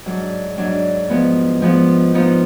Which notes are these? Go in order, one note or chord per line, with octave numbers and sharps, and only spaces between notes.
G#2 F#3 D4
G#2 F#3 D4
F3 G#3 B3
F3 G#3 B3
F3 B3 D#4